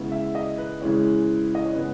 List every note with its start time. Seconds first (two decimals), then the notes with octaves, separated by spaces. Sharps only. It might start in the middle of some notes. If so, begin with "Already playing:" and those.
Already playing: C#3 G#3 B3 E4
0.12 E5
0.35 D#5
0.58 B4
0.82 C#3 E3 G#3 C#4 E4
1.55 D#5
1.65 C#5
1.75 C#3 G#3 B3 B4